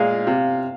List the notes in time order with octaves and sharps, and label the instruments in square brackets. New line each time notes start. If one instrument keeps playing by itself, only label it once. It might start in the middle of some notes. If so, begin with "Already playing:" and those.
Already playing: [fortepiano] A#2 G#3 [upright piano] F5
[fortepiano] C3